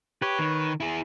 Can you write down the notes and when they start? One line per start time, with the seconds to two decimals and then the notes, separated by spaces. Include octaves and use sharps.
0.22 G4 B4 C#5
0.39 D#3
0.80 E4 G#4